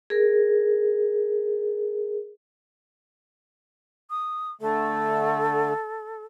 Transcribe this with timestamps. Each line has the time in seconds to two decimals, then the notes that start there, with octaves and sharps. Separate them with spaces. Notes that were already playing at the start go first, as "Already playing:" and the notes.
0.10 G#4 A#4
4.10 D#6
4.61 D3 A3 A4